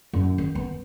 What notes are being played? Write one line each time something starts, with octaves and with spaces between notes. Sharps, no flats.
F#2
D#3
B3